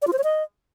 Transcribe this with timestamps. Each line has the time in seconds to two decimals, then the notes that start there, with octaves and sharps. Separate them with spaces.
0.02 D5
0.07 F4
0.13 C5
0.18 C#5
0.24 D#5